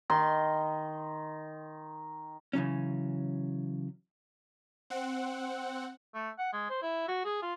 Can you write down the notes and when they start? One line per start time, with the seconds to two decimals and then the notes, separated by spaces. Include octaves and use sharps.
0.10 D#3 D#5 C6
2.53 C#3 E3 F#3 C#4
4.90 C4 F#5
6.15 A3
6.38 F#5
6.53 G#3
6.70 C5
6.83 E4
7.08 F#4
7.25 G#4
7.42 F4